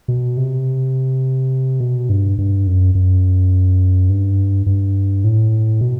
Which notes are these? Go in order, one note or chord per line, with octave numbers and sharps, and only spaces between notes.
B2
C3
B2
G2
G2
F#2
F#2
G2
G2
A2
B2